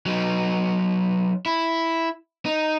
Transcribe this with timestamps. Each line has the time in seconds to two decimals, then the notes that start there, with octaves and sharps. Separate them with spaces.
0.06 F#3 D#4
1.46 E4
2.46 D#4